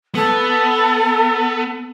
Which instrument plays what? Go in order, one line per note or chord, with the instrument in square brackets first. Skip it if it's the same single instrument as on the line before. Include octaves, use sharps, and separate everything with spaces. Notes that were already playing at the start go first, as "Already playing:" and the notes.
[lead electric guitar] B3 [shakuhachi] A4